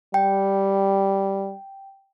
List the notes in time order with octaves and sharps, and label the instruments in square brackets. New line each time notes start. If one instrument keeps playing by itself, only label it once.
[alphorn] G3 [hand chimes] G5